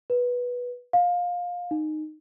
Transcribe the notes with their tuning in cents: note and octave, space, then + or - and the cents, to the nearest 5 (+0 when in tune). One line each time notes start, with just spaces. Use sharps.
B4 -10
F5 +20
D#4 -15